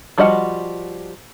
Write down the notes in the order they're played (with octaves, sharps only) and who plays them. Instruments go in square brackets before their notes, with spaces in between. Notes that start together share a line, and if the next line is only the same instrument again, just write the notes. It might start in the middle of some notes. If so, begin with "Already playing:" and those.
[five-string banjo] F3 G3 F#4 D#5 F#5